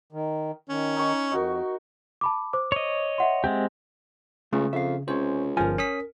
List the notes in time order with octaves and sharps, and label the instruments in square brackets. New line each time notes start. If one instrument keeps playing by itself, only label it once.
[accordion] D#3
[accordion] D#3 [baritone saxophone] C#4
[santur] D#4 C#6
[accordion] F2 [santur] D#4 F#4 A#4
[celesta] A5 B5 D6
C5 D6
[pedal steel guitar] C#5 D#5
[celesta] E5 F#5 C6
[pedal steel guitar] G#3 C4 G4
[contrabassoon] C#2 [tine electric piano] C#3 [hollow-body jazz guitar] A3
[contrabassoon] F2 [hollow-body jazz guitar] E5 F5
[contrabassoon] C#2 [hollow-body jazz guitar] C3 C#4 [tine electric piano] C5
[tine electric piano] G1 F3 [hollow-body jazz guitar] A#4 G#5
[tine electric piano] C#4 D#6 B6